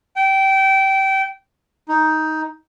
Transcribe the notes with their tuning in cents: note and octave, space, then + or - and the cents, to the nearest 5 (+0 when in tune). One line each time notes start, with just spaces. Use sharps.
G5 -25
D#4 +10